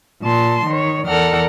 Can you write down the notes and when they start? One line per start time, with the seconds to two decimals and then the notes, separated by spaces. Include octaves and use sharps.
0.23 A#2 A5 C6
0.66 D#3 C#5
1.06 E2 A4 A#4 D5 F#5 F6